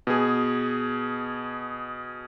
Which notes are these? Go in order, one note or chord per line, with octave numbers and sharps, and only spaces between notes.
B2 G#4